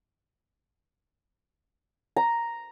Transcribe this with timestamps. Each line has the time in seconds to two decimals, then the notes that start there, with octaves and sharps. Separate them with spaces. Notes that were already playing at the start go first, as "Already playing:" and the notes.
2.16 A#5